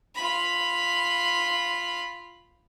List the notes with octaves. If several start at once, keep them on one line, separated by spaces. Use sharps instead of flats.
F4 B5